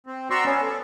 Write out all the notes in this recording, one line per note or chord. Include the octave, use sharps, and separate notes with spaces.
C4
F#4 D5 A#5 C6 C#6 E6
B3 C#4
A4